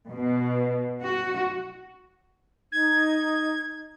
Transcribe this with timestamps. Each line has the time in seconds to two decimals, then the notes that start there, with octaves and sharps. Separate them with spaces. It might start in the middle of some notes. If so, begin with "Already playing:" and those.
0.10 B2
1.02 F#4
2.72 D#4 G#6